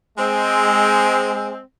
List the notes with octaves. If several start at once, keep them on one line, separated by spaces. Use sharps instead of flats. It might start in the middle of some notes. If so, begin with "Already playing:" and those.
G#3 C4